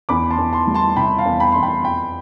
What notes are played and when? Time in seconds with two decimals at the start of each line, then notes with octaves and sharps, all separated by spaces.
0.09 E2 B5 D6
0.31 A5 C6
0.38 E2
0.52 A5 C6
0.67 G3
0.75 A5 C6
0.96 C3 G5 B5
1.18 F5 A5
1.26 E2
1.40 G5 B5
1.52 E2 C6
1.63 G5 B5
1.84 F2 G5 B5